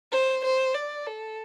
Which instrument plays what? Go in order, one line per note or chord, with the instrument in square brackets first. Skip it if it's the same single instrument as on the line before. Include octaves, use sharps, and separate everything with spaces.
[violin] C5
C5
D5
A4